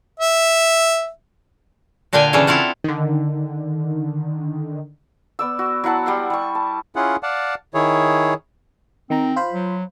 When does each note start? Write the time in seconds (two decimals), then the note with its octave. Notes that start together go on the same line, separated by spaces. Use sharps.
0.20 E5
2.13 A#2 D3 D4 F5 G5 G#5
2.33 C#3 E3 C#4 D4 A4
2.47 C4 E4 F4 F5 F#5
2.84 D3 D#3
5.39 B3 D5 E6
5.59 F#4
5.84 F#3 E4 F#5 A5
6.06 G3 F#5 C6
6.30 G3 C#6
6.55 A5
6.96 C#4 E4 F4 G#4 F#5
7.23 D5 F5 F#5 A5
7.74 D#3 E4 G#4 C#5
9.10 D#3 C4 A#5
9.36 F4 C5 B5
9.53 F#3